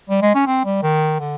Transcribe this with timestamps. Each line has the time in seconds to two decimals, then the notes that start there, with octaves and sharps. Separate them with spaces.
0.09 G3
0.22 G#3
0.35 C#4
0.46 C4
0.65 G3
0.83 D#3
1.20 D3